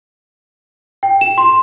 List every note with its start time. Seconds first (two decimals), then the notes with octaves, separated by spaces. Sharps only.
1.03 G5
1.21 E7
1.38 C6